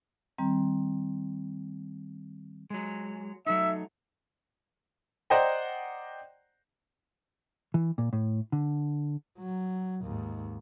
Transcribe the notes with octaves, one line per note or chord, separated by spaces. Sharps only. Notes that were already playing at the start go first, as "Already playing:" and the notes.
D#3 G3 C4 A#5
F#3 G#3
F#3 A3 D#4 E5
C5 D5 D#5 F#5 G5 A#5
E3
A#2
A2
D3
F#3
D#2 G#2